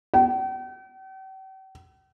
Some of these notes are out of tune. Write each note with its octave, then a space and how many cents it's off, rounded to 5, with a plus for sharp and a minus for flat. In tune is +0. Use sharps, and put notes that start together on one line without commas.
G5 -45